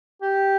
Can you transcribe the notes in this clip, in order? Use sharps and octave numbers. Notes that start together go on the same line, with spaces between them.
G4